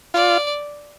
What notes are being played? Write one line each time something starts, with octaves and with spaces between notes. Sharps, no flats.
F4 D5